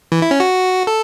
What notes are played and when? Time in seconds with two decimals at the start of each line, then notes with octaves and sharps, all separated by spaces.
0.12 E3
0.22 E4
0.31 C#4
0.40 F#4
0.87 A4